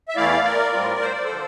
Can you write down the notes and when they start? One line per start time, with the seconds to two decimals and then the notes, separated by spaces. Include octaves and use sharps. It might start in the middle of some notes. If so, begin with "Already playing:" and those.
0.08 E5
0.16 E2 E3 A3 E4 D5 F5
0.44 A#4 D5
0.73 A2 G3 C4 F4
1.02 C5
1.13 D5
1.24 A4 C5
1.31 D3 F3